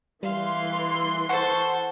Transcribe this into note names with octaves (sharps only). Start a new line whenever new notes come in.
E3 G3 F5 C6
A4 C5 F#5 C#6